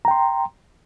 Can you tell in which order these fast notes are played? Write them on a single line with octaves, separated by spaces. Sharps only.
A#5 G5 C6